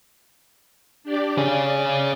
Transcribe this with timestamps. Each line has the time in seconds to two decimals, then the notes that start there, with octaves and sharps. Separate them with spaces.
1.03 D4 G4 D5
1.38 C#4 G#4 D5